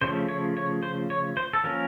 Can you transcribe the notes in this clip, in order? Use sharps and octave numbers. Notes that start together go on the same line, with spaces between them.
C#3 F3 A3 C5
C#5
C#5
C5
C#5
C5
A4
F3 A#3 C#4 A#4